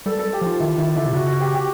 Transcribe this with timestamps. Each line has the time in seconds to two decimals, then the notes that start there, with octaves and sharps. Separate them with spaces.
0.06 G3 A4
0.19 A4
0.33 G4
0.41 F3 F4
0.60 D#3 E4
0.77 D#3 E4
0.96 D3 E4
1.06 C3
1.13 C#3 F#4
1.27 F#4
1.40 G4
1.54 G4